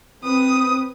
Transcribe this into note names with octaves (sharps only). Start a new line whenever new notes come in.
C4 B4 D#6